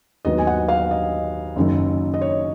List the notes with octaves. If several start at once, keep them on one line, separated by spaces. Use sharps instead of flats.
D#2 D#3 F#3 B3 D#5
G#5
F#5
F5
D#5
F#1 F#2 D#3
D#5
C#5